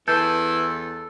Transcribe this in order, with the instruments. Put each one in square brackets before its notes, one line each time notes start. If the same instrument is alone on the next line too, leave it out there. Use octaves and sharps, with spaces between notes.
[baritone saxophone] E2 [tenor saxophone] E3 [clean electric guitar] A4 [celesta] G6